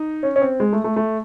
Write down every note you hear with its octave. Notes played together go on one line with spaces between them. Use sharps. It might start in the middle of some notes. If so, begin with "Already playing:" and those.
Already playing: D#4
C#4
C#4
C4
G#3
A3
A3
A3